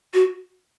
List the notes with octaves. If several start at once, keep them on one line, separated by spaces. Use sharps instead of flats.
F#4